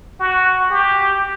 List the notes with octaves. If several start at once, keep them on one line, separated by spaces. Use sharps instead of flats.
F#4
G4